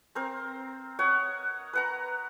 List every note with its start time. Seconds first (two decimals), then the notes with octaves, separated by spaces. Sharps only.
0.15 C4 A#4 C5
0.99 C#5 D#5 F#5
1.73 B4 F#5 A#5